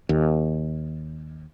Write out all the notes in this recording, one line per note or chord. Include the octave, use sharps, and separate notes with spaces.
D#2